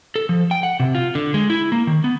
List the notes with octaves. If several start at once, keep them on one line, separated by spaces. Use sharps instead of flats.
A4
F3
G5
F#5
C3
F4
D3
G#3
E4
A#3
D#3
B3